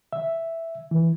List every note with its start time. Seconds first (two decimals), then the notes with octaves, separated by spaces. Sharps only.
0.13 E5
0.91 E3